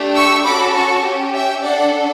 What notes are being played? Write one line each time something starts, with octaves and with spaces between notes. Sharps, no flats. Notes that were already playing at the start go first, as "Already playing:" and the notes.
Already playing: A3 D4 G4
C#6 E6
C#4 F#4 A4 B5 D6
A5 C#6
C#4 G4
E5 G5
D4 A4 D5 F#5